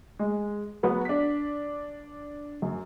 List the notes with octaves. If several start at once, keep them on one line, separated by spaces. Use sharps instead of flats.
G#3
F#3 B3 B4 F#5
D4 B6
F#2